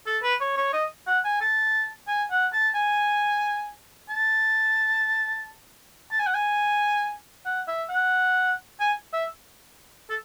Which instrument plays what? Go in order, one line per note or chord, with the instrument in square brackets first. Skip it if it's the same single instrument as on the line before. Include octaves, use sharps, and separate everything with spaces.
[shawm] A4
B4
C#5
C#5
D#5
F#5
G#5
A5
G#5
F#5
A5
G#5
A5
A5
G#5
F#5
G#5
F#5
E5
F#5
G#5
E5
A4